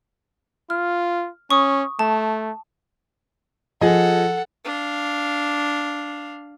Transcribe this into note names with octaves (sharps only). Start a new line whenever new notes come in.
F4 F6
C#4 C#6 D#6
A3 A5
F3 G#4 A4 D#5 F#5
D4 F5